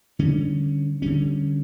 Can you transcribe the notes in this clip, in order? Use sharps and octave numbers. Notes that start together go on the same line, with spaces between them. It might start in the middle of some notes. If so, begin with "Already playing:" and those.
D3 G3 C#4
D3 G3 C#4